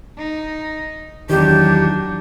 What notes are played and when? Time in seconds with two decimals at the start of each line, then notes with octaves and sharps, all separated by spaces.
0.18 D#4
1.29 E2 D#3 F#3 D4 G4